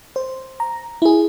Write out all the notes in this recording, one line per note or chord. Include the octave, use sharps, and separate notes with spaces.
C5
A#5
E4 G#4